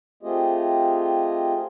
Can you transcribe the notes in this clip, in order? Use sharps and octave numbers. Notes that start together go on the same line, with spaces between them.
A3 C4 F4 G4 G#4 D#5